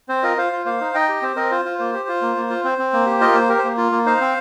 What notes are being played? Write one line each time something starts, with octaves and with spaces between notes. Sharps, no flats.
C4 C5
F4 A#4 D#5
F4 C5 F5
F4
A#3 C5 F5
D#4
D#4 D#5 G5
G4
C4 C5
C4 A#4 D#5
F4 C5
F4
A#3 C5
G4
F4
A#3
A#3
F4
C4 C5
C4
A#3
G4
F4 A#4 D#5
A#3 C5
G4 A#4
C5
A#3
F4
A#3
D#4 C5 F5
C4